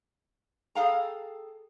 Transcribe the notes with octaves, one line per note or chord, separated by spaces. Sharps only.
G#4 A4 F5 G5 A#5